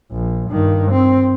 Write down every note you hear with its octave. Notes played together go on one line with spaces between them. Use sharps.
A#1
G2 D#3
C4